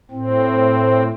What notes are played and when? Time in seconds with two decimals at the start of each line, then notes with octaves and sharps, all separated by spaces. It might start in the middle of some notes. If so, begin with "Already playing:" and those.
0.11 A2 C4